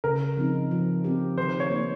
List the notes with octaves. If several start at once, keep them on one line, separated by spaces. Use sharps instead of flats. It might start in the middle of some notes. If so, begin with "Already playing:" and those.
C#3 A#4
F3 C4 D#4
F3
C4 G4
D#3 C5
C#5
A#3 D#4